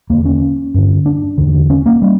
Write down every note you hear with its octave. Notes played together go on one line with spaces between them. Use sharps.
E2 D3 A#3
C#4
G2 D3
D4
E2 D3
C#4
A#3
G3